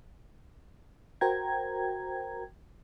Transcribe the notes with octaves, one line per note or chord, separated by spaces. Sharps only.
F#4 A#4 C5 G5 A#5 G#6